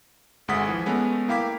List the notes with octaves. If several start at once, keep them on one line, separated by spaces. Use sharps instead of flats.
G#1 D2 G#3 F#5 D#6 B6
E3 F3
G#3 A3 B3 C#4
A#3 E4 F5 G5 D6 B6